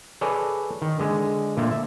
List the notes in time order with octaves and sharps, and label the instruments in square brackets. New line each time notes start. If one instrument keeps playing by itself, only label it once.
[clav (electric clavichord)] G#4 A4 B4 C#5 D5
D#3
D3 G#3
A#2 D3 A3 A#3
E5